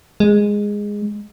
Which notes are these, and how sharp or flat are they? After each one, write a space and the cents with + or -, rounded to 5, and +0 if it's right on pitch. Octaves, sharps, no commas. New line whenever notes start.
G#3 -10